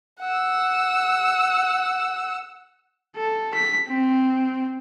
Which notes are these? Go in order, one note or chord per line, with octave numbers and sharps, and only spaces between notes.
F#5 E6
A4
B6
C4